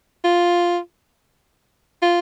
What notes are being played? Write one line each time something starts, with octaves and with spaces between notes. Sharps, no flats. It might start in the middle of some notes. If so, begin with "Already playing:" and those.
F4
F4